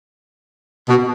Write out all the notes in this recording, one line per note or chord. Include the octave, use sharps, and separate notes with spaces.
B2